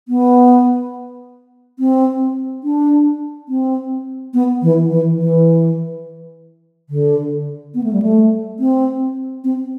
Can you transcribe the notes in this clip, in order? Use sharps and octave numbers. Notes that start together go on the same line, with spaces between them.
B3
C4
D4
C4
B3
E3
E3
E3
D3
B3
A3
G3
A3
C4
C4